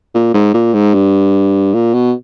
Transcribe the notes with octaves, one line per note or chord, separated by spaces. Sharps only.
A#2
G#2
A#2
G#2
G2
A#2
B2